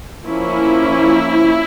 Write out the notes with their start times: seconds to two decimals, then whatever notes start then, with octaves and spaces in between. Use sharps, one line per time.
0.24 F3 A#3 C#4 E4